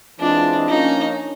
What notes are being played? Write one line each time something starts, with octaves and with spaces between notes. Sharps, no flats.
E3 G#3 C4 D4 F4
F3 A#3 C#4 D#4